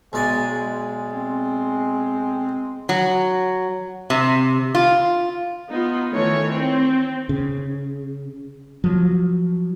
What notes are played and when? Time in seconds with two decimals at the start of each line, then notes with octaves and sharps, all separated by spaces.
0.13 B1 G#3 D5 G#5
0.53 G#3
1.13 C4
2.89 F#3
4.10 C3
4.75 F4
5.69 B3 D#4 F4
6.13 D#3 E3 A3 C#5
6.52 C4
7.29 C#3
8.84 F3 F#3